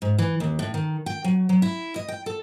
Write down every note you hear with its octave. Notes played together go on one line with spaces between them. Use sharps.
G#2
E3
D#2
A2
D#3
G5
F#3
F#3
E4
D#5
G5
A4